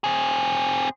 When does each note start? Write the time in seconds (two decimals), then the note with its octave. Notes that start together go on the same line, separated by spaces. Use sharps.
0.04 C4 G#4